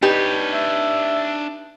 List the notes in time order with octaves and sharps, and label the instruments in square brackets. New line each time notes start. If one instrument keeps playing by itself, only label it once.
[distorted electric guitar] D4 C#5 [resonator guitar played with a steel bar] D#4 G4 B4
[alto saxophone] E5